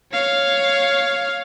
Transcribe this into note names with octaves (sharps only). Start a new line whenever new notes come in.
C#5 F5